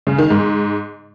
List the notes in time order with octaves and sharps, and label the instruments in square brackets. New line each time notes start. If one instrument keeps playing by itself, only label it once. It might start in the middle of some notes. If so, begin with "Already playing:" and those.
[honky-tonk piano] C#3
D#3
G#2